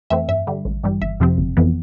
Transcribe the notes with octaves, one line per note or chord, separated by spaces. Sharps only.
F2 E3 A3 C4 E5
G2 E5
D3 G3
A1
G2 E3 G3
G1 E5
F2 C3 F3 C4
G1
F2 E3 B3